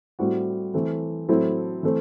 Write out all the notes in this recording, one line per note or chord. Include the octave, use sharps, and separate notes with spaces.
A2 G3 C4 F#4
E3 A3 C4
A2 F#3 C4 E4 A4
E3 A3 C4